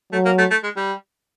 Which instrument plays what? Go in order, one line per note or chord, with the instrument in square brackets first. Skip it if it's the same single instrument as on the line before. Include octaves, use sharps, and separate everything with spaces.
[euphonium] F#3 [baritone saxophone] A3
[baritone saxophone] A#3
A3
A3
G#3
G3